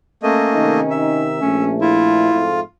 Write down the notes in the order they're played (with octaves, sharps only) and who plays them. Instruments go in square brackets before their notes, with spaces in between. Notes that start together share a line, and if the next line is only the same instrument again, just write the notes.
[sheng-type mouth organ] A3 A#3 D#5 [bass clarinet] C#4
[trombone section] C3 D#3 D#4
[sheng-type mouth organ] E5
[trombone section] A#1 A3 [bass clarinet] C#4
[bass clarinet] E4 [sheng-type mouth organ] F4
[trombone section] F2 G#2 A3